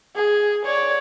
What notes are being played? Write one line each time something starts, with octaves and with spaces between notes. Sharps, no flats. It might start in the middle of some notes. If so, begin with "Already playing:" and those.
G#4
C#5 D5